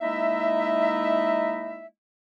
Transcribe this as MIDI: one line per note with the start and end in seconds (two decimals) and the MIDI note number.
0.01 1.86 56
0.01 1.86 58
0.01 1.86 63
0.01 1.86 64
0.01 1.86 75
0.01 1.86 76